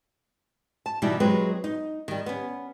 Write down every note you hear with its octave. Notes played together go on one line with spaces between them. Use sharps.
A5
B2 E3 G3 D#4 E4
F#3 G#3 C4 B4
D#4
D#3 G3
B3 C#4